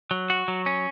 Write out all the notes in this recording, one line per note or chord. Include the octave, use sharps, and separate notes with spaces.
F#3
F#4
F#3
C#4